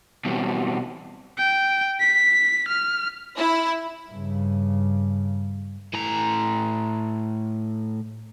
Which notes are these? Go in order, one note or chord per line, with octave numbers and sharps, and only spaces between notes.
B2 E3 F#3 G3 C4
G5
B6
F6
E4
G2 C#3
A2 A#5